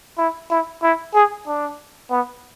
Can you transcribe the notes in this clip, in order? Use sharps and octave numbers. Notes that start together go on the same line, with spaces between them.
E4
E4
E4
G#4
D4
B3